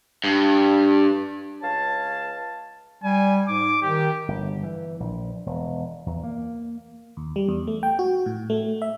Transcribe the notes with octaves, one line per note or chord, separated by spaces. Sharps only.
G2
C#2 C#5 F5 A5
G3 G#5
G#2 D6
D#3 G4
G1
E3
A#1
E1
E2
A#3
D#2
G3
E2
A3
G5
F#4
A2
A3
E5